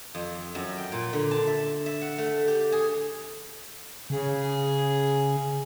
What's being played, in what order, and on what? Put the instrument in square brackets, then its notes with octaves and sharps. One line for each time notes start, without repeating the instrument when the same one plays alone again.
[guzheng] F2
F#2
G5
A#2
D3
A5
E5
E5
F#5
A3
G4
G#4
[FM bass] C#3 [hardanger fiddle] G#4